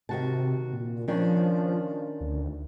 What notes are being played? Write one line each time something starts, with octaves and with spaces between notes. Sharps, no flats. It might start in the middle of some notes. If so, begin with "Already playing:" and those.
C3 D#3 F#4 A5
A#2
D#3 F3 C#4 D4
D2